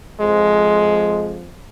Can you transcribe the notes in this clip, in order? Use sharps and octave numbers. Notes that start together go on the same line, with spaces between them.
F2 F3 G#3